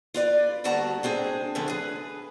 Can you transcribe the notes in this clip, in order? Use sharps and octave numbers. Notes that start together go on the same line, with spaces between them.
F4 B4 D5
D2 G3 B3 F#4 A5 A#5
G#3 C4 D4 G#4
D3 F3 A3 B3 C#4
G#4 B4